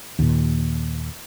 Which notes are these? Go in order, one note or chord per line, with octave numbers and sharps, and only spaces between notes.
D#2 A#2